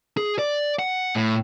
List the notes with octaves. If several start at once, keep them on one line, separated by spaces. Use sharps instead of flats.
G#4
D5
F#5
A2